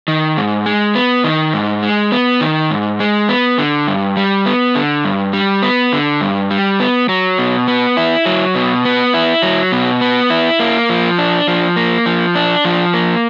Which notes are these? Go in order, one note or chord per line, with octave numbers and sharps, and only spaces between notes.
D#3
G#2
G#3
B3
D#3
G#2
G#3
B3
D#3
G#2
G#3
B3
D3
G2
G3
B3
D3
G2
G3
B3
D3
G2
G3
B3
F#3
B2
B3
E4
F#3
B2
B3
E4
F#3
B2
B3
E4
A#3
F3
D4
F3
A#3
F3
D4
F3
A#3